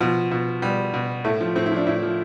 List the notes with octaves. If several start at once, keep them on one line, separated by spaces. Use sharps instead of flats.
B2 F3
B2
B2 G3
B2
A2 A3
F3
A2 C4
E4
F3 D4
A2 E4
F3